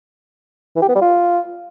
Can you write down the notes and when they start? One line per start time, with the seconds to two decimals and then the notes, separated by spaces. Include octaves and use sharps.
0.76 E3
0.82 G4
0.89 B3
0.95 G3
1.01 F4